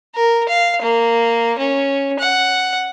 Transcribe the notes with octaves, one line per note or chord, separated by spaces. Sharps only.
A#4
F5
A#3
C#4
F#5